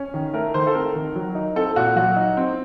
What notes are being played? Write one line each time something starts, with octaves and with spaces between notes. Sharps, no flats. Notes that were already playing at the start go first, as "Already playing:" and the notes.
Already playing: C#4
D#3
A3 A#4
D#3 C5
A4
C4 A#4
D#3
F#3
D#4
C4 A4
A#2 F#4
F#3 F#4
D#4
C4